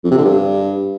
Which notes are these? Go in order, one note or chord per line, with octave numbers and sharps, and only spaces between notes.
F2
C3
D3
G2